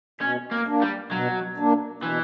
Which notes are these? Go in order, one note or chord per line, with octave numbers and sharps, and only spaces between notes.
B2 C#4
A#3
A#3 D4
G3
B2 F#3
A#3 D4
B2 E3